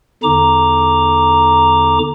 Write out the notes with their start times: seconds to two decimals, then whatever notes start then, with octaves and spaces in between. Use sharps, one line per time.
0.23 E2 D3 D#4 A#5 D6